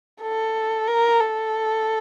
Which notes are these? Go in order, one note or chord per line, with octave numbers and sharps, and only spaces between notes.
A4
A#4
A4